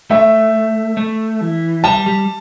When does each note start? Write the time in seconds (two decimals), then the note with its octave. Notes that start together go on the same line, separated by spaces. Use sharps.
0.10 A3 E5
0.97 A3
1.41 E3
1.84 G3 A5
2.06 G3